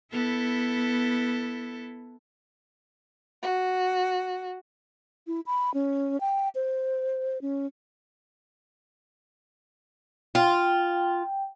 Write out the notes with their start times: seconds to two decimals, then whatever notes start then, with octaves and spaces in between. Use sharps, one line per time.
0.12 B3 E4 A4
3.42 F#4
5.26 E4
5.46 B5
5.74 C#4
6.20 G5
6.55 C5
7.42 C#4
10.35 F4 G5